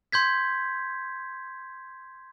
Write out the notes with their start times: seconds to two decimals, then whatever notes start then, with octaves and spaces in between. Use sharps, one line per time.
0.12 C6 G6 G#6 B6